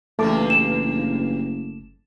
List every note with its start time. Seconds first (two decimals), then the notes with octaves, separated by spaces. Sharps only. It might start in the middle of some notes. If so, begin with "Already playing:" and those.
0.19 F#1 E2 G2 A3 A#3 A5 D6
0.50 E7